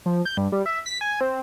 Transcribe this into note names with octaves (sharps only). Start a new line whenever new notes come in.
F3
G6
G2
G3
E5
B6
G#5
C4